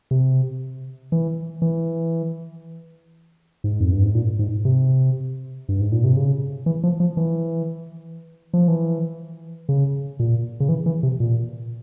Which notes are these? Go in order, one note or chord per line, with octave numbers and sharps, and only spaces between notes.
C3
E3
E3
G#2
F2
G2
G#2
A#2
G#2
C3
G2
G#2
A#2
C3
C#3
E3
F3
F3
E3
F3
E3
C#3
A#2
C#3
E3
E3
C3
A#2